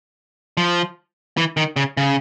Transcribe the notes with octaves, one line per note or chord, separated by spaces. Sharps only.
F3
E3
D#3
C#3
C#3